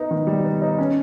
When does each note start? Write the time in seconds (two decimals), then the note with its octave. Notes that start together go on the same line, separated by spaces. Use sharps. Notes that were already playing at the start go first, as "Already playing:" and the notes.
Already playing: B3 D#4
0.11 D#3
0.27 G3
0.44 B3
0.62 D#4
0.79 C#4